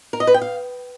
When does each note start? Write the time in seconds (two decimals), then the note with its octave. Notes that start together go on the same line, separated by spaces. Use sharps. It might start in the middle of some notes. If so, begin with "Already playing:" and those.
0.13 A#4
0.20 D#5
0.27 B4
0.34 G5
0.42 F5